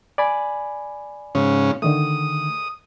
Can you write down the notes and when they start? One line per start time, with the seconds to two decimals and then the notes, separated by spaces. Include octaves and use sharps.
0.18 D5 G#5 B5
1.35 G#2 C#3 C#4
1.82 D3 D#3 A3 D#6